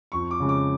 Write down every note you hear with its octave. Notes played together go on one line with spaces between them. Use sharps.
F2 C#6
D6
C#3 G#3
D6